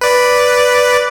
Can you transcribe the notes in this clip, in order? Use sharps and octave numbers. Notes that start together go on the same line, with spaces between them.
B4 D5